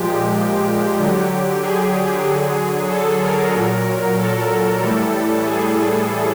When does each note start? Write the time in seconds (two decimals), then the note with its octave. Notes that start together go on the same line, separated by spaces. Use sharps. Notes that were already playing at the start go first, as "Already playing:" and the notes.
Already playing: A#2 F3 G#3 G4
0.99 D3 F#3
1.63 G#4
2.27 D3 F#3
2.91 A4
3.22 A#4
3.55 A#2 F#3
4.19 A4
4.82 A2 E3 G3
5.46 G#4